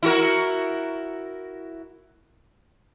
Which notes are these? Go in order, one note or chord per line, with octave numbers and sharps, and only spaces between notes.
E4 F#4 A#4